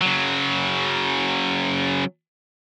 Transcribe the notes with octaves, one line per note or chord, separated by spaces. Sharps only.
C#3 F#3